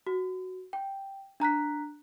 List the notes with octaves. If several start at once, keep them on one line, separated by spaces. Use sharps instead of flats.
F#4
G5
D4 A#5 F#6 B6